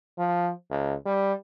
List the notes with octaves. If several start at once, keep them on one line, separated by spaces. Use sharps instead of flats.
F3
C#2
G3